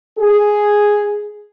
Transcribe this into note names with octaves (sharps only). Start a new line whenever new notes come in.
G#4